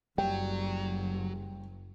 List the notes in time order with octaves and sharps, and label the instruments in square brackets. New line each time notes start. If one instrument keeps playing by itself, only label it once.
[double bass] F#1 [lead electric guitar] F#3 [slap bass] G3 [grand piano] G5